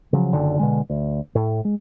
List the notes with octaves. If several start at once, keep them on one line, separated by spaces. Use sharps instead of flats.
C#3 F3 F#3
F#1 D3 D#3
B2 D3 G#3
D2
A2
G#3